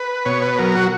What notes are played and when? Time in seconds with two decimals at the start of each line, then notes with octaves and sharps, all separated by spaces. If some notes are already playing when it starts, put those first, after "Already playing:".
Already playing: B4
0.25 B2 C#5
0.42 B4
0.58 F#3 A#4
0.75 F#4